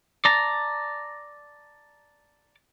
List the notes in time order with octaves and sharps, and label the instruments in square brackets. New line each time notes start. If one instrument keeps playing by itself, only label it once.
[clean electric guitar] D5 A5 A#5